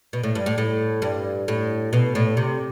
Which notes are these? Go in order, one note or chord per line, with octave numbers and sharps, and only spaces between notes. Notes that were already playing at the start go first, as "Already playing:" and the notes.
B2
A2
G2
A2
A2
G2
A2
B2
A2
C3